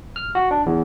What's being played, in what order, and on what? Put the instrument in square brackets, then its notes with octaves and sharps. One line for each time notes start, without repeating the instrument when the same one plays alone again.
[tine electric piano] F6
F#4
D4
E2